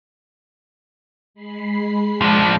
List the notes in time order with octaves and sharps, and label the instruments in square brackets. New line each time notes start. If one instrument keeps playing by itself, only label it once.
[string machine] G#3 B5 C7
[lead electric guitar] F3 D4